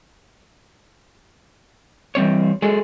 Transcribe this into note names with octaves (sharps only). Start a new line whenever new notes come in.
E3 G3 C4 C#5
F#3 G#3 G#4 A4